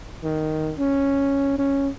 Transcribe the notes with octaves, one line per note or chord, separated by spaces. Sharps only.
D#3
C#4
C#4